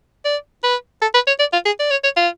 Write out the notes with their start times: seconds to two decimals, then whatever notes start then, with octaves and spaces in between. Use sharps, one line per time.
0.25 D5
0.64 B4
1.02 A4
1.14 B4
1.27 C#5
1.39 D5
1.53 F4
1.66 G#4
1.80 D5
1.91 C#5
2.04 C#5
2.17 F4